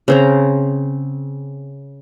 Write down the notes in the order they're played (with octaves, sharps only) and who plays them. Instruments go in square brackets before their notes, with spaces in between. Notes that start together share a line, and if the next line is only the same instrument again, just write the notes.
[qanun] C#3 C4 A#5